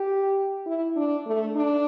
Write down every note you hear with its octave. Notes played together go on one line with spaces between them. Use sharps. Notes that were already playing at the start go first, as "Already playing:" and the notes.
Already playing: G4
E4
D4
A3
D4